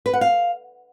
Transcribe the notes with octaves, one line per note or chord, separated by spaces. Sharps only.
B4
F#5
F5